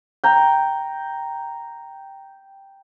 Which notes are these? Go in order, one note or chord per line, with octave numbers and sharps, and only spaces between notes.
G5 A#5